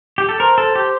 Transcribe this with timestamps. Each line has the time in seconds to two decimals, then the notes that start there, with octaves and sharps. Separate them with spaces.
0.18 G4
0.29 A4
0.40 A#4 C5
0.58 A4
0.75 G4